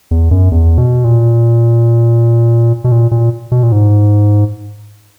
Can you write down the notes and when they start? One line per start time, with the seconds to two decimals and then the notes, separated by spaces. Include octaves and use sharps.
0.11 E2
0.31 F#2
0.52 E2
0.78 B2
1.04 A#2
2.84 B2
2.92 A#2
3.11 A#2
3.52 B2
3.63 A#2
3.72 G#2